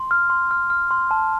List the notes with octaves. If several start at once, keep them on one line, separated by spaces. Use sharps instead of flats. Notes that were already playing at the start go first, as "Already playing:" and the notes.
Already playing: C6
F6
C6
F6
F6
C6
A5